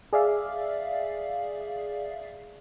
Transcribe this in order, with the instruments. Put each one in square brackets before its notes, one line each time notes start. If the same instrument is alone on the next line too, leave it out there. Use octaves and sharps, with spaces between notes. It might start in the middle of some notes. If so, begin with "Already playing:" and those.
[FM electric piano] G#4 D5 E5 F5